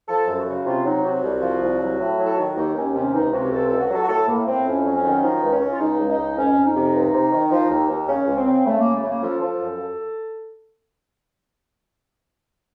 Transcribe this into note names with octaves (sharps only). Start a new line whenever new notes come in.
F3 A4
F#2 A4
F#4
C#3
C3 F4
F#3 D#4
C3 F#4
C2
F3
C2
F#3
A2
F#3
A4
D#3 F#4
D#2 D#4
D#2 C#4
C3 C#4
C#2 D#4
C3 F#4
C#2 A4
A4
C#2
F#4
F#3 A4
F#4
A2 A4
A2 A#3
A2 C4
F2 C#4
F#3
C#4
D#3
F3 D#4
C#2
C#4
C#3
F4
C#2 D#4
C#2
D#4
C#2
F2 C#4
F2
D#4
C3
C#2
C3
D#3
F3
D#2
D#2
C#3 C#4
C#2
C4
C#3
C#3 A3
F#2 A#3
A3
C#3 A#3
F3 A4
F3
F#2